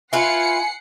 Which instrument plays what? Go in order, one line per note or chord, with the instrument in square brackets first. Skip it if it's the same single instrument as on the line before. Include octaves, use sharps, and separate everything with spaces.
[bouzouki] E4 F4 B4 [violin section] F#5 C7 C#7 [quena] G#5